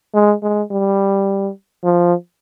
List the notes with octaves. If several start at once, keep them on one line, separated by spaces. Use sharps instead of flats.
G#3
G#3
G3
F3